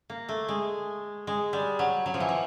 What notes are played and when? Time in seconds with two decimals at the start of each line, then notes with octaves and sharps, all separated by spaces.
0.10 A#3
0.29 A3
0.49 G#3
1.27 G#3
1.53 G3
1.79 F#3
2.06 F#3
2.14 F3
2.20 E3
2.29 F3